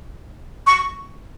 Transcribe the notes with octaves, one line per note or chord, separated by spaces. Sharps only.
C#6